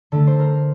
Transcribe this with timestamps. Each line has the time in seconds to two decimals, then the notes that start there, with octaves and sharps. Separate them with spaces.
0.12 D3 A3 A4
0.27 C5
0.39 A#4